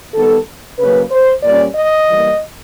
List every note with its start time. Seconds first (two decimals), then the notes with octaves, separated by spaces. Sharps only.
0.14 D#3 G3 B3 A4
0.79 C#3 F#3 A#3 C#4 B4
1.11 C5
1.43 A#2 G3 A#3 C#4 D5
1.76 D#5
2.07 E3 G3 A#3